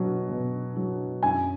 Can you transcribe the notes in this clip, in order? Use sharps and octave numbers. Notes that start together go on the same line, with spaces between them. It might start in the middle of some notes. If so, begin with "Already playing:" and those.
Already playing: B2 F#3
B2
F#3
F#2 G#5